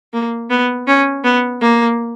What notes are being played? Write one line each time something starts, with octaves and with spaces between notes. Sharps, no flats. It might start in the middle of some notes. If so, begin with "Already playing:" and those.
A#3
B3
C#4
B3
A#3